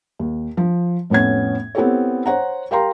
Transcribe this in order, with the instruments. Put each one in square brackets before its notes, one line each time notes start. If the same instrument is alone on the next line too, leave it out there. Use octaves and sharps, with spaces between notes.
[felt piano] D#2
F3
F2 A2 B3 C#4 G#6
B3 C4 E4 G4 A4 C#5
C5 C#5 F#5 A#5
G4 A#4 F5 G5 A#5 C6